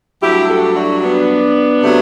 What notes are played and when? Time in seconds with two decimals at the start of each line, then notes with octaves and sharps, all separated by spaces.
0.22 G2 F#3 A3 E4 G4
0.49 F#4 A4
0.76 D4 F#4
1.02 B3 D4
1.83 C3 F#3 A3